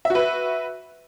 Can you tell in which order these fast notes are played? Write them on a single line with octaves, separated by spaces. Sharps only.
E5 F#4 B4